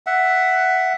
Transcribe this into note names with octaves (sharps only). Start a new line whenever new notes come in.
E5 F#5